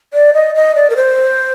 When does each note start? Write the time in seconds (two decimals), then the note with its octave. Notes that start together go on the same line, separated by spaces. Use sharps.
0.14 D5
0.34 D#5
0.55 D#5
0.76 D5
0.90 A#4
0.96 C5